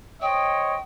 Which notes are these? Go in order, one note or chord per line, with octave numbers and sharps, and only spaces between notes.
C5 C#5 D#5 G5